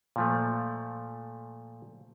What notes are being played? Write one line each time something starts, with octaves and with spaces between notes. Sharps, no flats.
A#2 F3 A3